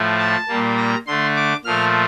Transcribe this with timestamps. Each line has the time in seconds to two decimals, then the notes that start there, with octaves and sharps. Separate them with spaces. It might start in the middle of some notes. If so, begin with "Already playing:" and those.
Already playing: A2 F3 A3
0.18 A5
0.48 A#2 G3 A#3
0.77 A#5
1.07 D3 A3 C6
1.36 D6
1.65 A#2 F3 A3 F6